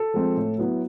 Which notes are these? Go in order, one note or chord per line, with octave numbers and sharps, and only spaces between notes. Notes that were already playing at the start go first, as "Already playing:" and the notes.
Already playing: A4
F3 G#3 C4
A2
F#3 B3 E4